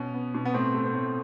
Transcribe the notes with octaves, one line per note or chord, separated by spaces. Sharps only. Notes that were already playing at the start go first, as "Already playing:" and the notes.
Already playing: B2 C#4
B3
B2
B3
A2 C4
A3
C4
A2